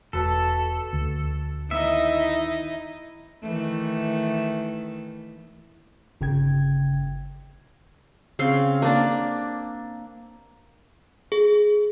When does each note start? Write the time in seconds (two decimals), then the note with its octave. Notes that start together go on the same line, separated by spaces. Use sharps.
0.13 E1 F#4 A4 B4 A5
0.93 D2
1.71 D#3 B3 D#4 E4 D#5 E5
3.42 D#3 E3 A3
6.21 G1 C#3 G5 G#6
8.39 C#3 C4 F5 C6
8.82 A#3 D4
11.32 G#4